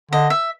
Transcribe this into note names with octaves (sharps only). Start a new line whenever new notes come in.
D3 D#5
E5